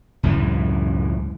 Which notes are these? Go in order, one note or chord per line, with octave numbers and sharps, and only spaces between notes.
C#2 F#2 A2 E3